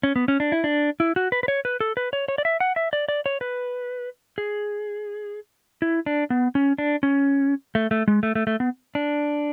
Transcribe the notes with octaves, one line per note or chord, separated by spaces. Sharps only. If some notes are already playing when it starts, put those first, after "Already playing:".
C#4
B3
C#4
D4
E4
D4
E4
F#4
B4
B4
C#5
B4
A4
B4
C#5
C#5
D5
E5
F#5
E5
D5
D5
C#5
B4
G#4
E4
D4
B3
C#4
D4
C#4
A3
A3
G#3
A3
A3
A3
B3
D4